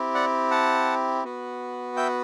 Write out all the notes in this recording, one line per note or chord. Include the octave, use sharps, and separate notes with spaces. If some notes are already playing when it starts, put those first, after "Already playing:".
Already playing: C4 E4 G4
D5 F#5
F#5 A5
B3 F#4
E5 G5